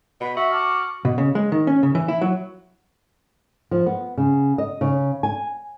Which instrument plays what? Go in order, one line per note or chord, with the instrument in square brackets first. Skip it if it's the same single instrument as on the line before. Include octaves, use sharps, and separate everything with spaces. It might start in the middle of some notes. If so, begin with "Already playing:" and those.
[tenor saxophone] B2 [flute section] B5
[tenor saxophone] F#4 [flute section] E5
[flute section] A5 D6 F6
[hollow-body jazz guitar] B2
C#3
G#3
D#3
C#4
C#3
E3
E4
F#3
[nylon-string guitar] F3
B3
C#3
D#5
C#3
G#5